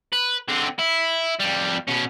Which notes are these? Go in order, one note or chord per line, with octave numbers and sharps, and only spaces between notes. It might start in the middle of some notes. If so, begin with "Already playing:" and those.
B4
D3 C4
E4
F2 G3
B2 C#4